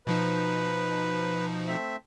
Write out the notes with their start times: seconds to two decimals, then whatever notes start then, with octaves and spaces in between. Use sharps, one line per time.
0.07 B2 F3 D#4 B4
1.68 A3 C4 E5